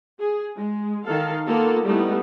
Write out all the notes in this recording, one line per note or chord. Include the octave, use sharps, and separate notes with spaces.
G#4
G#3
D#3 A4 F5
A#3 B3 F4 A4
G3 A3 B3 D#4 E4